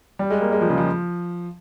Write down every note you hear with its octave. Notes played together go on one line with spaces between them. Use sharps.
G3
G#3
A#3
G#3
F3
C#3
F3